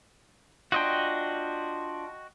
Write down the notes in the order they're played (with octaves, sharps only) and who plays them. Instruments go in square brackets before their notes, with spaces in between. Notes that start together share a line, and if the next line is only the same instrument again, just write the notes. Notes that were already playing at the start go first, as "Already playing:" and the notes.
[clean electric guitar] D4 F4 [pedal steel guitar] F#4 D#5 G5